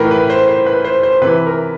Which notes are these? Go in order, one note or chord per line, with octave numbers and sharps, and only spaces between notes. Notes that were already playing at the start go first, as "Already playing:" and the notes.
Already playing: A2 E3 A#4 B4
B4
C5
C5
B4
C5
C5
C3 E3 B4
A#4